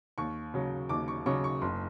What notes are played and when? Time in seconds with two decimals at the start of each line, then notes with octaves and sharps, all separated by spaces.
0.18 D#2 C#6
0.54 C#3 F#3
0.89 D#2 D6
1.08 C#6
1.26 C#3 F#3 C#6
1.44 C#6
1.62 F#1 C6